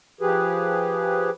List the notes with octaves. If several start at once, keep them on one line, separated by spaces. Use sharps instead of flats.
F3 G4 G#4 B4